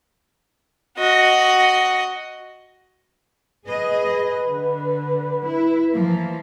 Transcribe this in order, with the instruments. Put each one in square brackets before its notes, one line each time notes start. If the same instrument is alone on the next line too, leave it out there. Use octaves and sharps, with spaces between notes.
[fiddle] F#4 D#5
[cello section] G#4 D#5 [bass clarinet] B4
[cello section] D3
E4
E3 F3 A#3